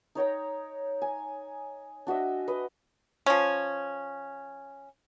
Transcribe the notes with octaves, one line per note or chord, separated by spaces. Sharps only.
D#4 C#5 G5 A#5
G#5
D4 F#4 D#5 E5
B4 D#5
F3 C#4